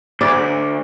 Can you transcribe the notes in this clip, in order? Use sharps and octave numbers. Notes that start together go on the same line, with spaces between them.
D2 D5